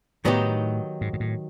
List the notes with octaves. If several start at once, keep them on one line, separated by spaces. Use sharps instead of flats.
A2 D#3 F#3 B3 D#4 G4
G#2
G#2
A2